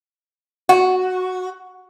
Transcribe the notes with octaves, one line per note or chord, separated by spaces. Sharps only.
F#4